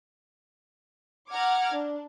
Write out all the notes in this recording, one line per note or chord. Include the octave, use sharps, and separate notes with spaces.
F#5 A#5 D6 F6 G#6
D4